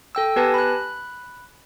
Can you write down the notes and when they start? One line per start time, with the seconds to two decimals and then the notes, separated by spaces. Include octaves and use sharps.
0.15 A4 G5 E6
0.36 B3 G4 B4 G#5 A5 A#6
0.54 B5 F#6